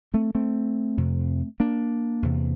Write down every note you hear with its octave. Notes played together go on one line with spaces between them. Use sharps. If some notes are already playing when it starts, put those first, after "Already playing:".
A3 C4
A3 C4
F2 C3
A#3 D4
E2 C3